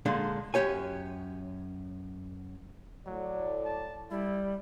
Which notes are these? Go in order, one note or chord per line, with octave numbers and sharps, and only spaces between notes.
A#2 D3 G#3 D4
F#2 D#3 G4 C#5 G#5
A2 F#3 D5
A5
G3 E4